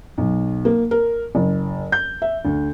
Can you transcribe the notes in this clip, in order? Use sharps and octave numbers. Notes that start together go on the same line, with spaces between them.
B1
A#3
A#4
F#1
G6
E5
D2